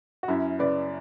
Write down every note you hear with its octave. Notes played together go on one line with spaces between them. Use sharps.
F#4
F#2 C#4 E4
C#3 B4 D5